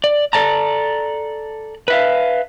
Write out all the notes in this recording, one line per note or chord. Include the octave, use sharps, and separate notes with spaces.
D5
A4 D5 A5 A#5
B4 E5 F5